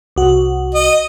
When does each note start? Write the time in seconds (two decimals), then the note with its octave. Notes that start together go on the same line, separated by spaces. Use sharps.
0.16 C2 F#4
0.75 D#5